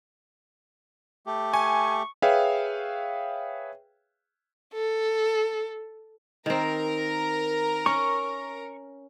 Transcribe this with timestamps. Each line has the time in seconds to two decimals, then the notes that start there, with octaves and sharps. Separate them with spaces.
1.26 A3 G4
1.54 G#5 C#6
2.22 G#4 B4 C#5 E5 F5 G5
4.74 A4
6.46 D#3 C4 A#4
7.86 C#4 C#6